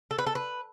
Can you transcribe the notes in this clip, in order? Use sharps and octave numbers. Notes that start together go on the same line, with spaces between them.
A4
B4
A4
B4